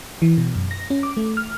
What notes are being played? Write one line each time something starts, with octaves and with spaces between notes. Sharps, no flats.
E3
B2
F#2
A#6
C#4
D6
A3
F6